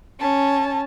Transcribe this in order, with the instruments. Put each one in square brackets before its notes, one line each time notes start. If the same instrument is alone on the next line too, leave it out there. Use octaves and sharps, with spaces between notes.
[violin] C#4 A5